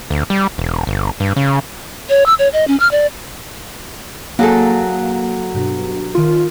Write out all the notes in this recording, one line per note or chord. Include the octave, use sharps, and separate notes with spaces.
D2
G3
E1
G1
G2
C#3
C#5
E6
C#5
D#5
C#4
F6
D5
F#3 A#3 G#4 A4
G2 B2
D#3 F4